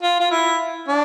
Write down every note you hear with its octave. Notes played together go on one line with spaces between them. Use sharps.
F4
F4
E4
D4